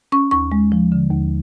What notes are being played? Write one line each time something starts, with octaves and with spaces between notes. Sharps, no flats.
C#4 C#6
D#2 C#6
G#3
F3
D3
D#2